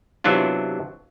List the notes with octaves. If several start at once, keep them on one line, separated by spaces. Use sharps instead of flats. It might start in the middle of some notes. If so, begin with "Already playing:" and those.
C3 E3 F#3 B3 D4 F4